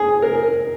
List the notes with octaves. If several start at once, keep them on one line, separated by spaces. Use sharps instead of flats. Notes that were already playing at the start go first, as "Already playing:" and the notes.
Already playing: G#4
A#4